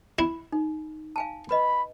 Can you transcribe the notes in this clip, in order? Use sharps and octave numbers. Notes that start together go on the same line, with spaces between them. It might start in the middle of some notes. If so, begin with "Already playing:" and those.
E4
D#4
F5 G#5 A5
B4 D#5 B5